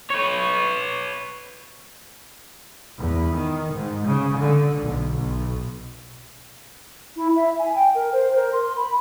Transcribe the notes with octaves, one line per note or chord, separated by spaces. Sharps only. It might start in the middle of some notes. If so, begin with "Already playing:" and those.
B4 C#5
E2
D#3
G#2
C#3
D3
B1
B1
E4
E5
G#5
G5
A#4
C5
A#4
C6
B5